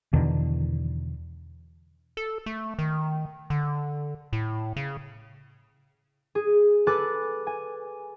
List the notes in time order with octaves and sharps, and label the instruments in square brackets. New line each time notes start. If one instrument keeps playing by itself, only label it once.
[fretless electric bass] E2 B2 D3 D#3
[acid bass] A4
A3
D#3
D3
A2
C#3
[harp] G#4
A4 B4 G#5 D6 F#6 A6
G#5